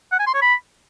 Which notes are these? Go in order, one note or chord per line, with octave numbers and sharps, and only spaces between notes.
F#5
G#5
C6
C#5
B5